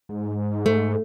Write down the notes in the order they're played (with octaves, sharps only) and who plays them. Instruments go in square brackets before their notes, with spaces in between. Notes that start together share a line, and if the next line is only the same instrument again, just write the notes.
[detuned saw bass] G#2
[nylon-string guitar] A3